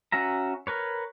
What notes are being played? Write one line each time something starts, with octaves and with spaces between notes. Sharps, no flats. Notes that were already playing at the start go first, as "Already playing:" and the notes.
C#4 F#4 E5 A#5
A#4 B4 C#5